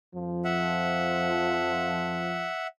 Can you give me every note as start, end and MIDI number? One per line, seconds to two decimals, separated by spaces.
0.14 2.49 41
0.14 2.49 53
0.44 2.67 76
0.44 2.67 78